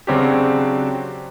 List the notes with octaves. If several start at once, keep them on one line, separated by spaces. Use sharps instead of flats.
C#3 F#3 C4 D4 F#4 G4